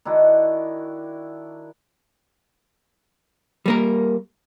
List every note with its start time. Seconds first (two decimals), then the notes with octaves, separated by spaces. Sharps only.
0.05 D#3 D4 E4 F#4
3.66 G3 A#3 A#4